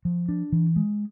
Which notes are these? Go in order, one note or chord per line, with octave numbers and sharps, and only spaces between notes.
F3
D4
E3
G#3